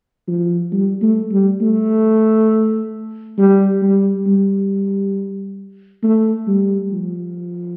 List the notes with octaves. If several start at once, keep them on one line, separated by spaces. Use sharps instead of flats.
F3
G3
A3
G3
A3
G3
G3
G3
A3
G3
F3